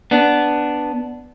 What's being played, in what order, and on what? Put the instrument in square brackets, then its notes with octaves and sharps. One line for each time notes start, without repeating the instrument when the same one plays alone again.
[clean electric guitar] B3 D4